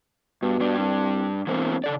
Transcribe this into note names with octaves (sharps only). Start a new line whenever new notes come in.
G2 B2
G2 D4
C2
E1 E3 A#3 C4
C#3 A4 D5